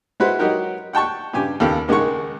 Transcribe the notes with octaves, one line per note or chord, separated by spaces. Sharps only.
G#3 E4 F#4 B4 C5
F#3 D#4 F#4 G4 A#4
F#5 G5 A5 C#6
G2 C#3 G4 G#5
D#2 C#3 B3 G4 A4 F5
C#2 D#3 G#3 D#4 F#5 C#6